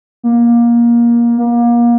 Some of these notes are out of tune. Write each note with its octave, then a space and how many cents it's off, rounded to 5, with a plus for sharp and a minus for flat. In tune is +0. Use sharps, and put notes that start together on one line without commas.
A#3 +20
A#3 +30